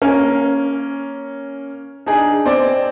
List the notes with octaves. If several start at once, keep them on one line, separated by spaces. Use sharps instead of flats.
A#3 C#4
D4 D#4 G#4
C4 D5